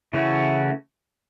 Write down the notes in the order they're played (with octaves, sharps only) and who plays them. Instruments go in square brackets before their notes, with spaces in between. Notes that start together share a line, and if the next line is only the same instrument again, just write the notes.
[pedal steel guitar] C#3 E3 A3 C#4 F#4 [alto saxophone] E4